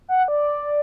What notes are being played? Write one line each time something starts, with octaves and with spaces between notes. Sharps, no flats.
F#5
D5